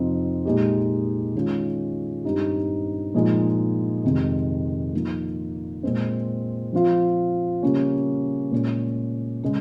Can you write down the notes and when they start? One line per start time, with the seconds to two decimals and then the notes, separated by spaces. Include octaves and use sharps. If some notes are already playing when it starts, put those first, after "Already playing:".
Already playing: F2 C3 F3 C4 D#4
0.45 A#2 G#3 D#4 G4
1.35 D#3 G#3 C#4 F4
2.24 G2 G3 C4 D#4 G4
3.14 A#2 F3 G#3 D#4 G#4
4.04 F2 C3 D#3 G#3
4.94 F3 A#3 D#4
5.83 A#2 G#3 C4
6.73 F3 C4 F4
7.63 C#3 G3 A#3 C#4
8.52 A#2 G#3 C#4
9.43 C#3 G#3